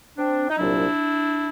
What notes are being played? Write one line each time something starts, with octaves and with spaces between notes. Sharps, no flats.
C4 D4
D#4
C2 A#2 F#3 D4 E4